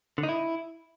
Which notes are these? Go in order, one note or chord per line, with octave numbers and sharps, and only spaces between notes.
D3
D#4
E4